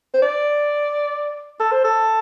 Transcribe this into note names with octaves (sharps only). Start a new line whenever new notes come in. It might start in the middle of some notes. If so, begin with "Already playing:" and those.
C5
D5
A4
C5
A4